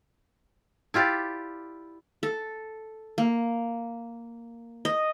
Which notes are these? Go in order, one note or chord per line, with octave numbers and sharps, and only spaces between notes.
E4 F4 G4 D5
A4
A#3
D#5